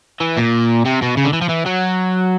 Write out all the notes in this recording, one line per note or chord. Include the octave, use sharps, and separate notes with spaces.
E3
A#2
C3
B2
C#3
D3
E3
F3
E3
F#3